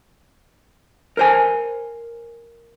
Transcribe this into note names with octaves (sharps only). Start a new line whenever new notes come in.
A#4 C5 G#5